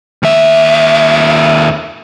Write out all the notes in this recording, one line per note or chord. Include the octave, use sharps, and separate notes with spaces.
D#2 E5